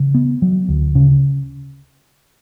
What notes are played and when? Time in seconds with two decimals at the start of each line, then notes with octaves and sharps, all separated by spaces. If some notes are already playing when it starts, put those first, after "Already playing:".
Already playing: C#3
0.15 B3
0.42 F#3
0.69 D2
0.95 C#3